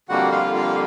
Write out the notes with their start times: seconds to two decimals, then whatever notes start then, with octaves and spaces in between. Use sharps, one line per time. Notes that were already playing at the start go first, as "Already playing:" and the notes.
0.09 F2 D3 G3 A#3 F#4 F#5
0.32 F4 F5
0.55 F4 F5